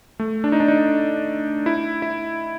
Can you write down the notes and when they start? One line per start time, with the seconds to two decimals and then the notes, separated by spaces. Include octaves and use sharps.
0.19 A3
0.44 D4
0.52 D#4
0.60 D4
0.68 D#4
1.66 E4
2.02 E4